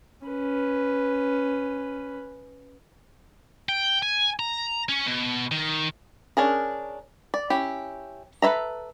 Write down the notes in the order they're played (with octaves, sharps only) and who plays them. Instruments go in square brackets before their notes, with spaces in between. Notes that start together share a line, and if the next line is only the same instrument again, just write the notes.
[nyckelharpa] C#4 B4
[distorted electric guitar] G5
G#5
A#5
C#4
B2
D#3
[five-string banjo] C#4 D4 G#4 A#4
D5
C#4 E4 G4
A4 B4 C5 E5 A#5